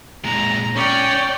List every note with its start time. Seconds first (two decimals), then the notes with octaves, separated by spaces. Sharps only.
0.24 A#2 G#3 A#5
0.76 C#4 C#5 D5 G5